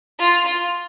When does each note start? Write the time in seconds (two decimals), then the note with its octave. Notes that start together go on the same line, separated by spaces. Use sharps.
0.19 F4
0.46 F4